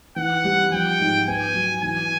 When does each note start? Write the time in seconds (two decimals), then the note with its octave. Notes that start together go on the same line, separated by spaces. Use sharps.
0.16 E3 F#5
0.44 G3
0.72 F3 G5
1.00 G#2
1.28 B3 G#5
1.55 F#3
1.82 E3 G#5